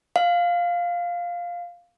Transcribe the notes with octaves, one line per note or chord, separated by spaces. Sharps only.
F5